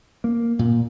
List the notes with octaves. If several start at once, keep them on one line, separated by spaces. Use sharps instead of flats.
A#3
A#2